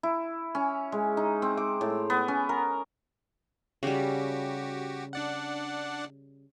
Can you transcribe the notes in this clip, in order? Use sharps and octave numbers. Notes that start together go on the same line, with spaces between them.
E4
C#4
G#3
D#4
C4
D6
A2
B3
C#4
A#4
C#3 G3 F#4 G4
D4 D5 F#5